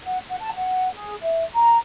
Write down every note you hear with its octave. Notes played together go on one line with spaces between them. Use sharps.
F#5
F#5
A5
F#5
G#4
E5
A#5